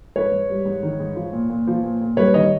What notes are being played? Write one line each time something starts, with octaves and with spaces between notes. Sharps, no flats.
G#2 B4 C#5
G#2
G3
G#2
D#3
G#2
F3
A#2
A#2
F3
A#2
A#2
G2 B4 C#5
D#3 C#5 D#5